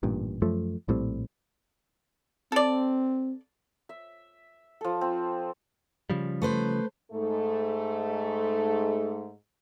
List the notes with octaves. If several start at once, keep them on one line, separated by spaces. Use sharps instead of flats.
A1 G2 A#2
F#2 F3 A3
A#1 A2 G3 C4
C4 A4 D5
E5
F3 A4
C4
C#3 F3 G3
A3 B4 C5
G#2 A3